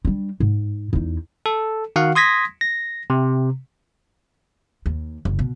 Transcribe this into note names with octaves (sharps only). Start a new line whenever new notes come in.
G3 D4
G#2
E2 D#4
A4
D#3 F#4 F5 F#5
C6 D#6 G#6 A#6 B6
A#6
C3
D#2
F#1
B2